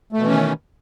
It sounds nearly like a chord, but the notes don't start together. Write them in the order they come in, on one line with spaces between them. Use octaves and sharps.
A3 B2 E3 C#4 D#3